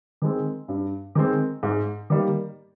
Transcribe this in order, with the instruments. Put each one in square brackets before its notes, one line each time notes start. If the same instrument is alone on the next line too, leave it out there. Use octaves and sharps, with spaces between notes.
[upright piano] D#3 G#3 C4
G2
D#3 G#3 C4
G#2
D#3 G3 A#3